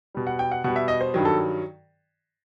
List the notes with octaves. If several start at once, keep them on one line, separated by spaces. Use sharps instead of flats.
B2 G3
F#5
G5
F#5
B2 G3 F#5
E5
D#5
C5
G2 D#3 F#3
A4